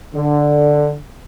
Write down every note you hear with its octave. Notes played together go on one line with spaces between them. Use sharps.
D3